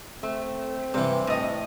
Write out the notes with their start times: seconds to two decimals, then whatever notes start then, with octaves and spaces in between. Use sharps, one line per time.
0.23 A3 C4
0.94 G2 C3 E3
1.27 A2 D#5